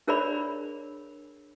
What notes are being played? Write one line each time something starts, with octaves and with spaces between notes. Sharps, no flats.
D4 G#4 A#4 C#5 D5 B5